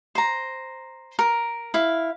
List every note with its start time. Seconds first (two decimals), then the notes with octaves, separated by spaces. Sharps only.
0.15 C5 A#5
1.19 A#4
1.74 E4 F5